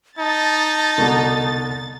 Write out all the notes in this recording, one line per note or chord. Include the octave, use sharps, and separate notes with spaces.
D#4 A5 A6
C2 B2 D3